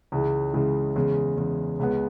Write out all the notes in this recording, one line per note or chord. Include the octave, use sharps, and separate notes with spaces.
C#2 C#3 E3 G#3
C#2 C#3 E3 G#3
E2 C#3 G#3
E2 C#3 G#3
C#2 C#3 G#3 B3